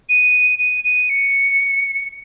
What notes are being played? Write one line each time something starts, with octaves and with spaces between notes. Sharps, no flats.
D#7
D#7
D#7
C#7